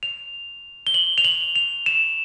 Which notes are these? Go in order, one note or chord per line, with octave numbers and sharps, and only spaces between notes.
F7
G7
F#7
F7
F#7
F7
E7